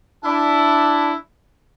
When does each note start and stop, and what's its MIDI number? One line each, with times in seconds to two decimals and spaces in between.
0.24 1.14 62
0.24 1.14 64